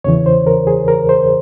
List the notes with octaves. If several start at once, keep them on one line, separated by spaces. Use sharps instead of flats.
E2 C#3 E3 C#5
C5
A#4
G#4
A#4
C5